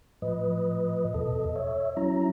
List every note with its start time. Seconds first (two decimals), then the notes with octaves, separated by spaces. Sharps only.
0.22 A2 F3 B4 D#5
1.14 E2 B2 A4 D#5
1.56 C#5 E5
1.97 F#3 C#4 E4 A#5